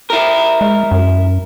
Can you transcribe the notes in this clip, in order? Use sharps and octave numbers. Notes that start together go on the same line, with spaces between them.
E4 A#4
G#3
F#2